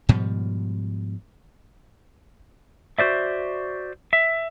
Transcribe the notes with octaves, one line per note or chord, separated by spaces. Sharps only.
G#2 B2 F3 G3
F#4 C5 D5 E5
E5